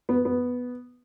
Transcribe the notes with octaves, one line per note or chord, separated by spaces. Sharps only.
B3
B3